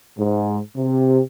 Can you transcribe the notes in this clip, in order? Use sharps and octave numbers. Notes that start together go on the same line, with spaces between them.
G#2
C3